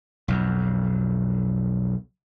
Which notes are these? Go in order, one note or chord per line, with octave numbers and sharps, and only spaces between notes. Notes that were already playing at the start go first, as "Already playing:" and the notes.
B1 F2